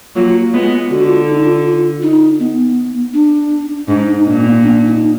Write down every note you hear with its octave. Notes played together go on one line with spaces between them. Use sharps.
F#3 A#3 F4
G#3 B3
D3 F#4
F4
D#4
F4
F4
D#4
B3
D4
G#2 D4
D#4
A#2 D4
B3
D4
D#4